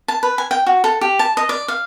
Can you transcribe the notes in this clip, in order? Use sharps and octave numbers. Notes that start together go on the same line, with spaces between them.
A5
B4
G#5
G5
F#4
A4
G4
A5
D#5
D5
F5